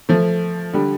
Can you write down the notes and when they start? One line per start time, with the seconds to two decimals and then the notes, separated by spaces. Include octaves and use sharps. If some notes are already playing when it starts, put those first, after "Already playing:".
0.09 F3 A3
0.73 D3 G3